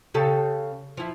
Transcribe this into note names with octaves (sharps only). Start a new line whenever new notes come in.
C#3 G4 A4
F3 E4